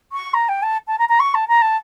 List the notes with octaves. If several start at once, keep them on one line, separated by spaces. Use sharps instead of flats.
C#6
A#5
G5
A5
A5
A#5
A#5
C#6
A5
A#5
A5